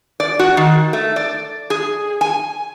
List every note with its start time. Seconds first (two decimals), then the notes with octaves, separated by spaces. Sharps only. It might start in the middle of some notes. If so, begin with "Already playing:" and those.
0.20 D5
0.39 F#4
0.57 D#3
0.93 A3
1.16 D5
1.70 G#4
2.21 G#5